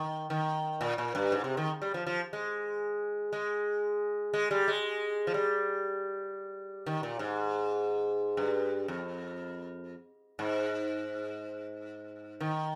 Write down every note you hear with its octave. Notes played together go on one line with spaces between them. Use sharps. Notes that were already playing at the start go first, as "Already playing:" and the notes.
Already playing: D#3
D#3
A#2
A#2
G2
G#2
C3
D#3
G3
F3
F3
G#3
G#3
G#3
G3
G#3
F3
G3
D#3
A#2
G#2
G2
F2
G#2
D#3